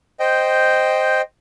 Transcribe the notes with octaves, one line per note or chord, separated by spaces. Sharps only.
C5 D#5 G5